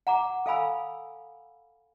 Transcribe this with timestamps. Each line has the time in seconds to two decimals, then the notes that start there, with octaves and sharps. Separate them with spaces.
0.07 F#5 A#5 D6
0.46 A4 F5 G#5 B5 E6